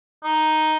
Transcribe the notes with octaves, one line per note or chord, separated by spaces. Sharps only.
D#4